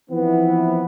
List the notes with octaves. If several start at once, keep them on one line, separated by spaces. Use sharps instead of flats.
E3 F3 B3 C4 E4